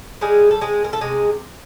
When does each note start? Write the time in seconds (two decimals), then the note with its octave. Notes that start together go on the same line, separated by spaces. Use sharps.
0.21 G3 G#3 G#4
0.51 A4
0.61 G#3 C4 G#4
0.84 A#4
0.93 A4
1.01 C3 G#3 G#4